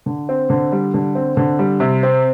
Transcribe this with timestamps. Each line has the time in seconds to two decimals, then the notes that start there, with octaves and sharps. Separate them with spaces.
0.06 D3
0.29 C4
0.50 D3
0.72 G3
0.94 D3
1.15 C4
1.37 D3
1.59 G3
1.80 C3
2.03 C4